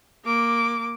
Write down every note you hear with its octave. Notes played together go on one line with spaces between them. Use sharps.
A#3 D6